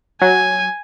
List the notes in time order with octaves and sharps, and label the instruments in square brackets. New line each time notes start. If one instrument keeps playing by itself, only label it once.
[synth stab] F#3 [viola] G#5